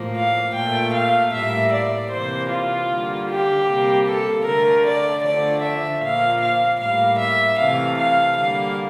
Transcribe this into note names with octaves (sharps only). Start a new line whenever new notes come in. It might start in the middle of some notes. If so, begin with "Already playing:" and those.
Already playing: A2 F3 A#3
F5
A#2 A3 G5
F5
A2 G3 A#3 E5
D5
C3 E3 A#3 C5
F4
D3 G3 A#3
G4
C3 G3 A#3
A4
D3 A3 A#4
D5
D3 F3 A3 D5
E5
A#2 F3 A#3 F5
F5
A2 G3 A#3 F5
E5
C3 E3 A3 F5
F5
D3 G3 A#3 F5